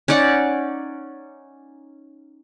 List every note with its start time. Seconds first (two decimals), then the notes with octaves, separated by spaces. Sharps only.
0.08 C#4 D#4 D5 F#5